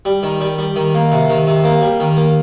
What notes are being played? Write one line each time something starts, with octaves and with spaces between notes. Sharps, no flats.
G3
D#3
G3
G3
D#3
A#3
C3
D#3
C3
A#3
G3
D#3
A#3